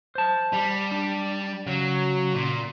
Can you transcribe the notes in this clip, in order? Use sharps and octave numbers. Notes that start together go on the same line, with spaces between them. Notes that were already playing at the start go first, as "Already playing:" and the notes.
C5 A5
G3
D4
C#3 F#3
A#2